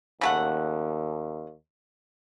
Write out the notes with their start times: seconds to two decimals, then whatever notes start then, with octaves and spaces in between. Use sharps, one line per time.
0.21 D#2 C#3 A3 F#5